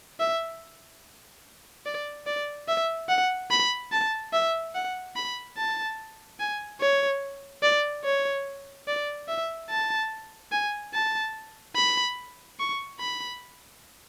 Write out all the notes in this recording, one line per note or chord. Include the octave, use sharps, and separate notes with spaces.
E5
D5
D5
E5
F#5
B5
A5
E5
F#5
B5
A5
G#5
C#5
D5
C#5
D5
E5
A5
G#5
A5
B5
C#6
B5